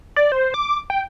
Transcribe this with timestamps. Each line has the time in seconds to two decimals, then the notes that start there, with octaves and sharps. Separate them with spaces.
0.16 D5
0.32 C5
0.54 D6
0.90 G5